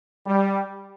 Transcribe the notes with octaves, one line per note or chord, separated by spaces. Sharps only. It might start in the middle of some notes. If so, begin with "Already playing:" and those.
G3